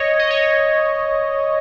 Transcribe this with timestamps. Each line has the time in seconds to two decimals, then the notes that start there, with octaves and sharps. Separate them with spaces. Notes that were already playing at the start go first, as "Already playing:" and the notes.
Already playing: C#5 D#5
0.19 D#5
0.30 C#5